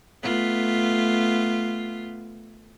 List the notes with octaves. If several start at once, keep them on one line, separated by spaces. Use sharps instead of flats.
A3 B3 F4